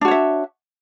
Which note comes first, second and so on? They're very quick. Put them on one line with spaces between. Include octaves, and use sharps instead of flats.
D4 F#4 C#5 E5